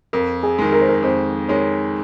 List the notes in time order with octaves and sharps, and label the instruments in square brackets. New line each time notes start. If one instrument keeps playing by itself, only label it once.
[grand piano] F2 [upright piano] A#4
[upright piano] G#4
[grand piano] D#3 G#3
[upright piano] A#4
C5
A#4
[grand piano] F2 [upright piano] C5
[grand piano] D#3 G#3 [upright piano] C#5